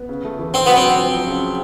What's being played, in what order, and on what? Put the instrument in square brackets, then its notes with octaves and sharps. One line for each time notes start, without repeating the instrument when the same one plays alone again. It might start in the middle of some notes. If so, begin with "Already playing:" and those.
Already playing: [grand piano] B3
C#3
A3
E3
[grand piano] D3 [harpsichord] C4
[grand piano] F#3 [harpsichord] B3
[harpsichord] C4
[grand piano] F#3
F3
F3
C#3